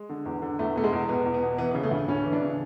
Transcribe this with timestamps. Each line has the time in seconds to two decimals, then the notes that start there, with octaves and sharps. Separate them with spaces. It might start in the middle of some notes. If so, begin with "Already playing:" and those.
Already playing: G#3
0.10 D3
0.25 E2
0.42 D3
0.59 E2 A3
0.76 B2 A3
0.84 G#3
0.93 E2
1.09 B2 B3
1.25 E2
1.34 B3
1.43 B2
1.58 E3 B3
1.71 C#3 B3
1.83 A3
1.91 D2
2.08 D2 C#4
2.25 E3
2.33 D4
2.41 C#3